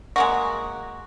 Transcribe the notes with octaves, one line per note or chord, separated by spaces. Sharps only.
G#3 A#3 F#4